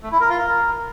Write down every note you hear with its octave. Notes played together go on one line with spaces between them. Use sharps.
A3
E4
A#4
F4
A#4